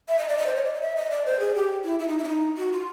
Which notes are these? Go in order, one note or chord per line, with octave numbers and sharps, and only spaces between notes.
E5
D#5
D5
D#5
C5
C#5
D5
D#5
E5
D#5
D5
C5
G#4
G4
E4
E4
D#4
E4
D4
D#4
F#4
F4